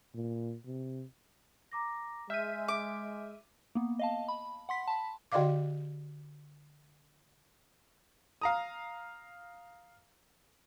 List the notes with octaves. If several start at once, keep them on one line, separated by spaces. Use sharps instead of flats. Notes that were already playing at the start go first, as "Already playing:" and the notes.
A#2
C3
A#5 D6 A#6
G#3 E5 F6 G6 B6 D#7
D6
A#3 B3
D#5 F5 A5
B5
F#5 C6 B6
A5 B5
D3 F#4 D5 D#5 F5 D6
F5 A#5 D#6